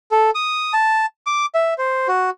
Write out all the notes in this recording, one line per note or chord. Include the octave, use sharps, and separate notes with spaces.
A4
D#6
A5
D6
E5
C5
F#4